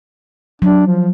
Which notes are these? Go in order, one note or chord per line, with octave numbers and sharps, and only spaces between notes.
F#3 D4
F3